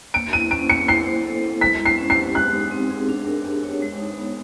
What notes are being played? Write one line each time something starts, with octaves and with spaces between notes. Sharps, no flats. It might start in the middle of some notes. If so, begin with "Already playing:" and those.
A#3 D7
E4 D#7
C#4 D7
A#3 C#7
E4 C7
C5
A4
E4
G#3 B6
E4
C7
C#4
C7
G4
G#3 F#6
D#4
C4
G#4
D4
A#4
G4
C#5
G#3
D#4
B3